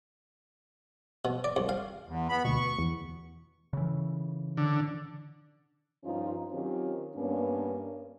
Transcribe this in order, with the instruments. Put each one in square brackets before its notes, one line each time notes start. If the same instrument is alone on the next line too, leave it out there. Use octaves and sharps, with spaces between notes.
[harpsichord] B2
D5
C2
F5
[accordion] E2
B3 B5
[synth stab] D2 B2 [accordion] C#6
[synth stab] E2
[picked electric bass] C#3 E3
[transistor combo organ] D3
[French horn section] G2 F3 C#4 D#4 F4
D#3 F#3 C4 C#4 F4 G4
G2 A#3 B3 C#4 D4